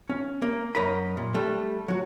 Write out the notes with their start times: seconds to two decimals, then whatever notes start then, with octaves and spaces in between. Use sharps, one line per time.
0.09 C#4
0.42 A#3
0.75 F#2 A#4 D#5 B5
1.17 A#2
1.34 G3 A3 D4
1.88 F#3 F#4